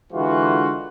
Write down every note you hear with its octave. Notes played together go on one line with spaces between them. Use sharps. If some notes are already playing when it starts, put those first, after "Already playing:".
D3 E3 G#3 F4 F#4